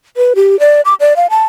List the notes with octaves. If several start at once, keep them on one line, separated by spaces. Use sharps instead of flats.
B4
G4
D5
D6
D5
F5
A5